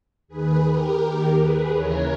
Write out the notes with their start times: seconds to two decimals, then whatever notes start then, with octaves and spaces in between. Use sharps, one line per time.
0.28 D#2 D#3 G#4 B4
0.65 G4 A#4
1.02 D#2 D#3
1.38 G#4 B4
1.74 D#2 C#3 E3 A#4 C#5